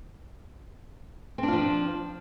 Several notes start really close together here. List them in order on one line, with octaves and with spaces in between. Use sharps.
C4 D4 F4 F3